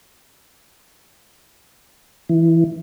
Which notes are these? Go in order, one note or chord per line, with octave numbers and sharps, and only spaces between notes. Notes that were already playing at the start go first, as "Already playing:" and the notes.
E3